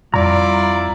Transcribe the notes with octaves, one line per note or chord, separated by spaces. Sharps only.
F2 G3 E4 F4 D5 A#5